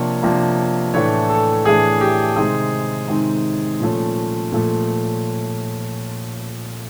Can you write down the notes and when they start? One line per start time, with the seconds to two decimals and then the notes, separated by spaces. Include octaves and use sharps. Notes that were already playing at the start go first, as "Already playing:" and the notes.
Already playing: C3 F3 A#3 D4 C#5
0.23 C3 F3 A#3 D4
0.94 A2 E3 A3 D4 C#5
1.29 A4
1.65 A2 E3 A3 D4 G#4
2.01 G4
2.36 C3 D#3 G#3 C4 D#4 G#4
3.08 C3 D#3 G#3 C4 D#4
3.80 A#2 F3 A3 C#4
4.52 A#2 F3 A3